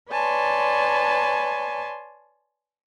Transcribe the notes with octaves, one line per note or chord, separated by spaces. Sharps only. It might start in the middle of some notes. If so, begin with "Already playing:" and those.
B4 C#5 D5 G#5 A5 C6